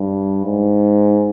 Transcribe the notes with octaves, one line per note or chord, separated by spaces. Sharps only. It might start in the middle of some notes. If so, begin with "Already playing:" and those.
Already playing: G2
G#2